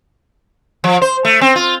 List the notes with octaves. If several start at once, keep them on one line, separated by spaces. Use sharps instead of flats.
F3
C5
A3
C4
F4